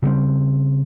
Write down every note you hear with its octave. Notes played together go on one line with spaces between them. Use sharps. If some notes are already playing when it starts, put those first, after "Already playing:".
C#3 G3 A#3 C4